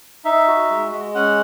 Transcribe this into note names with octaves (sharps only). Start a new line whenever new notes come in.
D#4 E5
F#4
G#3
G#3
C#4 F#5